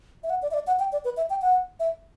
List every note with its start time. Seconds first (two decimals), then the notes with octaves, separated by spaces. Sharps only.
0.24 E5
0.30 F#5
0.42 D5
0.51 E5
0.54 D5
0.67 F#5
0.79 G5
0.92 D5
1.05 B4
1.17 E5
1.30 G5
1.42 F#5
1.80 E5